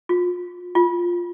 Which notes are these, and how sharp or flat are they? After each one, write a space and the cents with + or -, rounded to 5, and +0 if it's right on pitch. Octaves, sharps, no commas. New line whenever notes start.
F4 +30
F4 +0